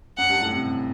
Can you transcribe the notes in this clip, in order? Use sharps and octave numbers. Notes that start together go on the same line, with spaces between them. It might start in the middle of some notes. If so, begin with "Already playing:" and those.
F#2 F#5
G2
A2
C3